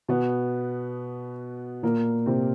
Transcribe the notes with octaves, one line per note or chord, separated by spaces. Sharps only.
B2 B3
A#2 A#3
C3 C4